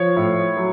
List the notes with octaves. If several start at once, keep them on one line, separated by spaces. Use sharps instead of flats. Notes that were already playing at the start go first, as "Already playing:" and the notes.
Already playing: F3 C#5
A2
F#3